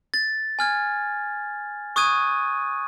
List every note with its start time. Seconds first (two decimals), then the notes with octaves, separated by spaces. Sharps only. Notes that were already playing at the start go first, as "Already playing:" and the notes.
0.14 A6
0.59 G#5 F6 G#6
1.96 C#6 D#6 F#6 G#6 D#7